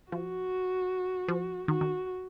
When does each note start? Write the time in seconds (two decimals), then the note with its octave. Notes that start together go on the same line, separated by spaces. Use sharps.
0.12 F3 F#4
1.28 F3
1.68 D#3 F#4
1.81 D#3